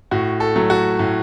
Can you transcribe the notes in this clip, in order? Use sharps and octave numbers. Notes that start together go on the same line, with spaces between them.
A2 F#4
A4
F#3 A3
F#4
A2